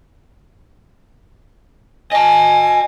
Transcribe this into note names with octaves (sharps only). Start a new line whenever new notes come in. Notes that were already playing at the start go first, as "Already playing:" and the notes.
D#5 G#5 A5